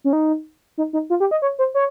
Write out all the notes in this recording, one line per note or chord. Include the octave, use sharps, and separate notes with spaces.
C#4
D#4
D#4
D#4
F4
G4
D#5
C#5
C5
C#5